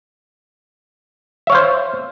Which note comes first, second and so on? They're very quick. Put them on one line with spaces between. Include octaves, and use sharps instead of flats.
E5 C#5 F5 C5